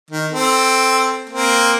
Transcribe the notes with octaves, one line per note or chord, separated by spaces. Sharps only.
D#3
C4 A4
A#3 C4